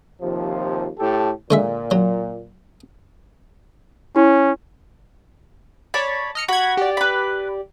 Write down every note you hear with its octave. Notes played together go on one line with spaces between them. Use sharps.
D#2 C3 F3
A2 G4 A4
A#2 D3 G#3 E5
F#3
C#4 E4
C#5 D5 A5 B5
D#5 F6 C#7
F#4 B5 G#6
G4 D5
B4 B5